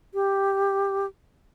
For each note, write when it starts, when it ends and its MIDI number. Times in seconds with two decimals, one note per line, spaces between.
0.14 1.06 67